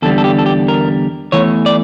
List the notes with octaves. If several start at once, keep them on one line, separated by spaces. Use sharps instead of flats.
E2 D3 G3 A4
A4
G4
A4
G4
A#4
E2 C#3 E3 A3 C#5
D5